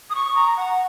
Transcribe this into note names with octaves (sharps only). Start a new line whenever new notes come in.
D#6
C#6
A#5
F#5